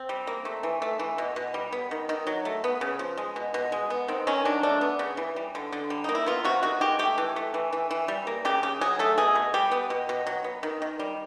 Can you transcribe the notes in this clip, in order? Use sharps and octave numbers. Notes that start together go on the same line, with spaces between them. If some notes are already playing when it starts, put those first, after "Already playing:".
Already playing: C4
G3
A#3
A3
E3
A3
E3
B2
B2
G3
B3
D#3
D#3
F#3
A3
B3
C#3
F3
G#3
B2
B2
G#3
B3
D#3 C4
D#3 C#4
F#3 D4
A3 D4
B3
C#3
E3
G3
D3
D3
G3
A#3 D#4
E4
B3 F4
C3 F#4
D#3 F#4
G#3 G4
A3 G4
E3
A3
E3
E3
E3
G3
A#3
C#3 G4
C#3 G4
F#3 G#4
A3 A4
B2 G#4
B2
G3 G4
B3
B2
B2
F#3
B3
D#3
D#3
G3